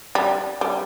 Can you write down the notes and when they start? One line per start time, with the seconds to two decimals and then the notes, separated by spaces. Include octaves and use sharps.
0.15 G3
0.61 G3